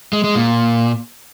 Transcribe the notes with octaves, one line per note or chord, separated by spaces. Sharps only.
G#3
G#3
A#2